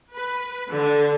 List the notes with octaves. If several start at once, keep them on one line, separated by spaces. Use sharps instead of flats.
B4
D3